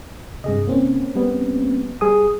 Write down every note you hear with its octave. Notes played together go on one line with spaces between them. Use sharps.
G2 C3 G#4 D#5
A#3 C4 C#4
G3 B3
G3 G#4 D#6